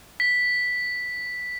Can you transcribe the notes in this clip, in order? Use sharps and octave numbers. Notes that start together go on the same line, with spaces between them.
B6